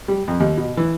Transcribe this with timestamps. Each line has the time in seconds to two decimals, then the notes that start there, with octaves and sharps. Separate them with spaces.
0.08 G3
0.28 F2
0.40 D#2
0.57 B2
0.77 E3